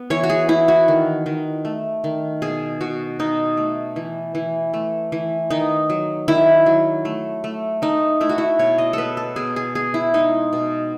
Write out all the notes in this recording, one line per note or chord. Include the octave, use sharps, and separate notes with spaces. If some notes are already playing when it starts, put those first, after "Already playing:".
Already playing: B3
E3 C#5
F#4
G#4
E3 E4
F#4
D#3
D#3
A3
D#3
B2 G#4
B2 F#4
B2 D#4
A3
E3
E3
A3
E3
D#3 D#4
F#3
D#3 E4
F#3
A3
A3
A3 D#4
A3 E4
F#4
E4
B2 C#5
D#5
B3 A4 B4
A4
B2 G#4
G#4
B3 G#4
E4
G#3 D#4
B2